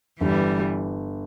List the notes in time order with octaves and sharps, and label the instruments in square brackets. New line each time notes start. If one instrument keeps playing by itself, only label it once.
[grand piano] G1 [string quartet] E3 G3